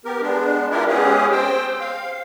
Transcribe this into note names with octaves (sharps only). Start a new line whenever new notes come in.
B3 G4 A#4
G#3 B3 D4
D4 E4 F4 G4 A#4
G#3 B3 C#4 G4 G#4
C4 C5 G5
F5